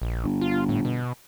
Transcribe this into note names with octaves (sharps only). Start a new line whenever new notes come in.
A#1
G1
F4
A2
B2